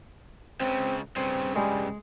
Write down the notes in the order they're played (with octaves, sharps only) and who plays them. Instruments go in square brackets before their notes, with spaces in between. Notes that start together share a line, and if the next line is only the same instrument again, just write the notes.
[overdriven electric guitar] C#2 C#3 [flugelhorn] C4
[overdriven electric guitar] G2 C#3 [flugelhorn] C4 [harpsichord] C6
[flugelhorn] G3 [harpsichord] G#3